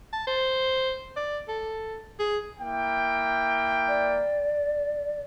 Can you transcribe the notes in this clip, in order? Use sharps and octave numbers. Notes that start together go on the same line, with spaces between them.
A5
C5
D5
A4
G#4
A#3 E4 G5
D5